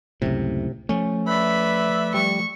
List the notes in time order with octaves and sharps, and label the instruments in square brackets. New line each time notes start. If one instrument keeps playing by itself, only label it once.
[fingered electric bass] C#2 F#2 A2 [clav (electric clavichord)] C3
[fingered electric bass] F3 A3 [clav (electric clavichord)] C#4
[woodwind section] B4 D5 E5 [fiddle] B5
[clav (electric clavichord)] G3 [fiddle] C#6